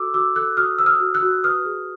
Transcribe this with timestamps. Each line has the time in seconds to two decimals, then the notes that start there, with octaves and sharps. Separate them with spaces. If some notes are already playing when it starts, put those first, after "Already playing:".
Already playing: F#4 A4 D6 E6
0.14 F#4 D6 E6
0.35 A4 E6 F#6
0.57 F#4 D#6 F6
0.79 C5 E6
0.86 D#6 F6
1.00 F#4
1.15 E6 F#6
1.22 F#4
1.44 B4 D#6 F6
1.65 G#4